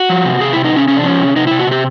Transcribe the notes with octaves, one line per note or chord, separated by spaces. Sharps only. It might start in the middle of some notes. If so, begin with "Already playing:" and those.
Already playing: F#4
F3
C3
C3 G#4
C3 E4
D#4
C3 C#4
C3 C#4
D4
F3 C#4
C3
C3 D#4
C3 E4
F#4
C3 G4